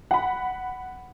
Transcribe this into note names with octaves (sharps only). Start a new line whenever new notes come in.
F#5 B5